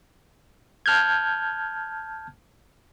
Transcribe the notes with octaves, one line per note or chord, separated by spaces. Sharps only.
A5 F6 G6 G#6